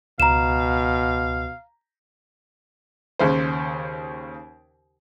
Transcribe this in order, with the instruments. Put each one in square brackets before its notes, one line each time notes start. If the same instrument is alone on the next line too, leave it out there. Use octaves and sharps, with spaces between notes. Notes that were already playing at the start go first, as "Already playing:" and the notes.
[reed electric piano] C#2 [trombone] B2 [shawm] F5 [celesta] A#5 E7
[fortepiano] D#2 C#3 C5